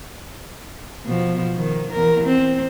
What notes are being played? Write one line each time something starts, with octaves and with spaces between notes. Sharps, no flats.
B2 F3
D#3
E2 A#4
C4